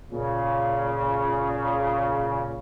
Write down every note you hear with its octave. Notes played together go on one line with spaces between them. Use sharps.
A#2 C#3